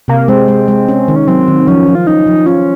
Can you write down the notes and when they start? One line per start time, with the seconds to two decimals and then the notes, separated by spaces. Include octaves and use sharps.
0.08 C3 A#3
0.28 G#3 C4
0.48 G#3
0.68 G#3
0.88 C#4
1.08 D#3
1.16 C#4
1.27 F#3 C4
1.48 D#3
1.68 F3 C#4
1.87 F3
1.95 F4
2.07 C#4 D#4
2.27 F3
2.46 C#4 F4